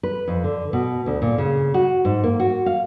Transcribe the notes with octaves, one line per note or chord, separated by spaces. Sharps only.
B4
F2
D3
B2
D2
A#2
C#3
F#4
G#2
A#3
F#4
F5